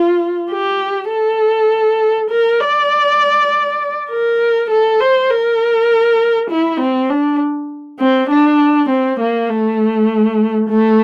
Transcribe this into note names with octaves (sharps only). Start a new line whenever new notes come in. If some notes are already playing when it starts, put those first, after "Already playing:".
Already playing: F4
G4
A4
A#4
D5
A#4
A4
C5
A#4
E4
C4
D4
C4
D4
C4
A#3
A3
A3